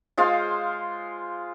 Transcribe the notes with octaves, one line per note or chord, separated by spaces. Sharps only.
G#3 F4 C5 F5